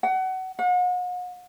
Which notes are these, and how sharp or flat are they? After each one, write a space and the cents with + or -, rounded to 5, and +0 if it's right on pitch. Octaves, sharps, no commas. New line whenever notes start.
F#5 +25
F#5 -40